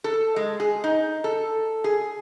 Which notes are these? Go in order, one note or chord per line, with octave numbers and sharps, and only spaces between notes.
A4
G#3
G#4
D#4
A4
G#4